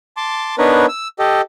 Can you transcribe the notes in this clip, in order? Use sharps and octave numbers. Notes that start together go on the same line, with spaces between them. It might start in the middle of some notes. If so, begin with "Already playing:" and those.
A5 C6 D6
B3 D4 D#4 A#4 B4 C#5
E6
G4 A4 D#5